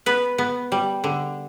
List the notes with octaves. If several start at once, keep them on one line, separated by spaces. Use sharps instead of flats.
B3 B4
B3
G3
D3